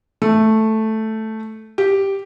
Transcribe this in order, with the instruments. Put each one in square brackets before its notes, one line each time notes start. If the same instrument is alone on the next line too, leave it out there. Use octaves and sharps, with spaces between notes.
[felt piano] A3
G4